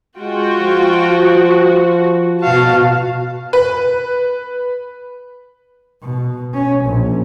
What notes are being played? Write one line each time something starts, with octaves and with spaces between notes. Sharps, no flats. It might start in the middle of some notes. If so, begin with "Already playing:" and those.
G#3 F4 F#4 G5
F3
B2 F#4 F5 A5
B4
B2
C#4
A#1